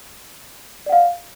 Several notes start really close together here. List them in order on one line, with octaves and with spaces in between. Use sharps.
D5 F#5 F5